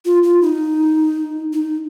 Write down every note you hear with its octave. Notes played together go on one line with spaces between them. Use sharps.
F4
F4
D#4
D#4